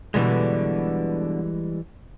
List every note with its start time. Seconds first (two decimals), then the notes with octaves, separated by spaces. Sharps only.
0.14 F#2 B2 D3 E3 G3 G#3